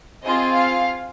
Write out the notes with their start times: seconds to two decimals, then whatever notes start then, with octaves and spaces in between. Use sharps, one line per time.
0.23 C4 F4 G#4 D#5
0.54 F5